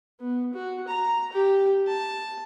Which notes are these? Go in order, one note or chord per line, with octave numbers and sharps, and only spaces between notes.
B3
F#4
A#5
G4
A5